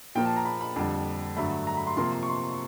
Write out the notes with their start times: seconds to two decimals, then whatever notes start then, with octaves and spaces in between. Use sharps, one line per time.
0.15 A#2 F3 A#3 G5
0.25 A5
0.36 A#5
0.45 B5
0.61 B5
0.76 F2 D3 G3
1.37 G2 D3 F#3 A3 B5
1.67 A#5
1.77 B5
1.87 C6
1.97 C3 F3 A#3 C6
2.12 C6
2.23 C#6
2.28 C6